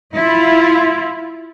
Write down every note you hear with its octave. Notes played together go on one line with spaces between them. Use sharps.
E4 F4